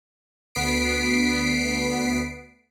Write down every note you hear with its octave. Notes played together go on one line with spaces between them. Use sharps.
D2 B3 B6 C7 D7